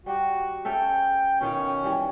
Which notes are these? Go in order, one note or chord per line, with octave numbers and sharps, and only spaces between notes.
G3 F#4 G4
C#4 A4 E5 G5
B2 D#3 C#4 F4
E3 G3